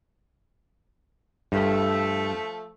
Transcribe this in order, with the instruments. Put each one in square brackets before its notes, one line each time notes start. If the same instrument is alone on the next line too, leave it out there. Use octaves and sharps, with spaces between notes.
[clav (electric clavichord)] G2 [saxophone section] F3 A3